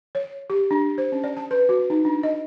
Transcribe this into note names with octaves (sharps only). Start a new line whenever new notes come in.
C#5
G4
D4
C5
C#4
D5
A5
B4
F#4
D#4
D4
D#5